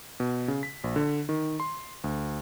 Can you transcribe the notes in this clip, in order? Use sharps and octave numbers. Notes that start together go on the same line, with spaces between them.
B2
C#3
B6
A#1
D3
D#3
C6
D2